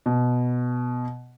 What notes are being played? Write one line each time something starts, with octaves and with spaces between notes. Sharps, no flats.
B2